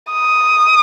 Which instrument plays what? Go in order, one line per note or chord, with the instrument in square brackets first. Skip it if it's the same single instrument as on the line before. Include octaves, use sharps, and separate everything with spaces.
[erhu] D#6